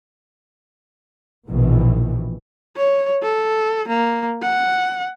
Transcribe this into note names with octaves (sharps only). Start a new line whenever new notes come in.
A#1 B2 D#3 E3
C#5
A4
A#3
F#5